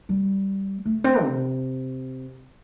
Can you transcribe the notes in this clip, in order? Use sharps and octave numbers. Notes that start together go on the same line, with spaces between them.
G3
A3
C4
C3